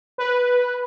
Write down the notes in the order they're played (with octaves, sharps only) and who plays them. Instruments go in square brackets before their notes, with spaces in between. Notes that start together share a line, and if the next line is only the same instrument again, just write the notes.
[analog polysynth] B4